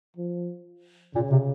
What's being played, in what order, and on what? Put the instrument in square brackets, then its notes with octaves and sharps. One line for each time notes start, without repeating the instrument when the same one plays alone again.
[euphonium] F3
[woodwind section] A#2 [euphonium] C#3
[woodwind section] C3